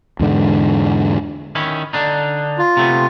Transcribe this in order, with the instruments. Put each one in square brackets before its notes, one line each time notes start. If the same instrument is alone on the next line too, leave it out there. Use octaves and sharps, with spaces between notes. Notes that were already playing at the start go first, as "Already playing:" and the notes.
[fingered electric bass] E2 G#2 D3
[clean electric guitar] D#3 C#4 E4
D3 D4 D#4
[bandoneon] F4
[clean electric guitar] C3 A3 B3